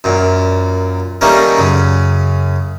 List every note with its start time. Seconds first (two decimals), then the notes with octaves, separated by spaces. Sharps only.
0.04 F#2 A#2
1.21 D#3 G3 A3 A#3 C#4
1.57 F#2 C#3